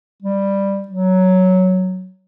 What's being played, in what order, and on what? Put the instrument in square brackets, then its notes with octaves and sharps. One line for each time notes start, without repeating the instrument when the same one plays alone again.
[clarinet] G3
F#3